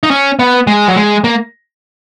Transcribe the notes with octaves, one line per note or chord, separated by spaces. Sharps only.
D#4
C#4
B3
G#3
F#3
G#3
A#3